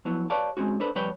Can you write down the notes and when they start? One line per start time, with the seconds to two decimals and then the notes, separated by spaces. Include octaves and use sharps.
0.05 F3 F#3 B3 E4
0.30 G4 B4 C#5 D5 F5 A5
0.57 G#3 A#3 C4 C#4 F#4
0.80 D4 A4 B4 C5
0.95 F2 G3 B4 C#5 G5